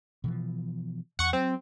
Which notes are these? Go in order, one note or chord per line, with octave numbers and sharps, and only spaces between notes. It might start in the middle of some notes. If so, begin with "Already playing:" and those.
B2 E3 F3
E2 F#5 C#6
F#3 C4